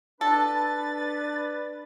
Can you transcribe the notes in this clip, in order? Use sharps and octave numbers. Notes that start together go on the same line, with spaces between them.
D4 A4 B4 A6